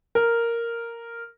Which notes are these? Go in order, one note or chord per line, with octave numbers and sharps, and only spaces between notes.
A#4